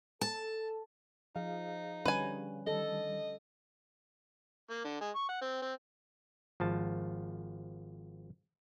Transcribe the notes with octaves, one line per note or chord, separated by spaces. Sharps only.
A4 A5
F3 D#4 G#4 F5
D3 G3 C#4 B4 G#5
D#3 G3 A4 D#5
A#3
D3
G#3
C#6
F#5
C4
C4
G#1 F3 A5